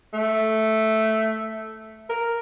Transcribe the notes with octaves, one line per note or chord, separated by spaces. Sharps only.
A3
A#4